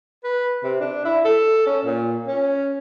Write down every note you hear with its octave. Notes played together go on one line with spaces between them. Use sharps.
B4
C3
D4
E4
A4
C#4
A#2
C#4